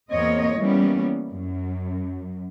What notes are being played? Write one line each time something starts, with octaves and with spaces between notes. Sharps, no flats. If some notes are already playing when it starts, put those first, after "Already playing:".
E2 A#3 C4 C#5 D#5
E3 G3 A#3 B3 C#4
F#2